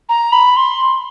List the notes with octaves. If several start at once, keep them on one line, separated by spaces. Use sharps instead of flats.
A#5
B5
C6